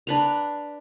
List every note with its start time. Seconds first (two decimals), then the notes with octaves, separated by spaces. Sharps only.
0.07 D4 B4 A#5